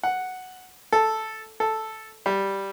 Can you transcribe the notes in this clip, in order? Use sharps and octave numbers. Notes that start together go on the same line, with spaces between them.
F#5
A4
A4
G3